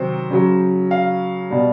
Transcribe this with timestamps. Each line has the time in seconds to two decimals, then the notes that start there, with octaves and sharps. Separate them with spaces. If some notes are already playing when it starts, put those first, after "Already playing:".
Already playing: C3 D#3 F#3 C5
0.30 C#3 F#3
0.91 F5
1.50 B2 G3